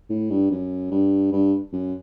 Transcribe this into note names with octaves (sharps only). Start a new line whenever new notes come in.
A2
G2
F#2
G2
G2
F#2